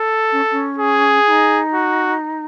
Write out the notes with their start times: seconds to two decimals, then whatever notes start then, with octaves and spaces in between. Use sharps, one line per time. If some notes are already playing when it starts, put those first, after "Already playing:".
Already playing: A4
0.32 C#4
0.51 C#4
0.79 G#4
1.26 E4
1.30 D#4
1.74 F#4